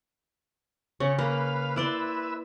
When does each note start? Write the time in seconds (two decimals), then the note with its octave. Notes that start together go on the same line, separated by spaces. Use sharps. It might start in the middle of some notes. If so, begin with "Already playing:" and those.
1.00 C#3 C#4 C#5
1.19 A#3 B4 F5
1.76 E4 B4 D5 E5 C6